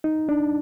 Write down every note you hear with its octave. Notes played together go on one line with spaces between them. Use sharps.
D#4
D4